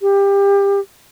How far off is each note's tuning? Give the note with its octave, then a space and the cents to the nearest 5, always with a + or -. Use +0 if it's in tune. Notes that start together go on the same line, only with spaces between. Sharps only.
G4 +25